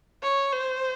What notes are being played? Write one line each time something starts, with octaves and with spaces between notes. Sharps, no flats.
C#5
C5